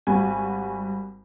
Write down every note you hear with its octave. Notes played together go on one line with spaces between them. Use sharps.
G#1 G3 F#4 G#5